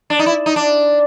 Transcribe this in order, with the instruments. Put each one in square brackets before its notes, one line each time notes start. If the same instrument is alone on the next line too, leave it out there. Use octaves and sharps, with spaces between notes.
[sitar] D4
D#4
E4
D#4
D4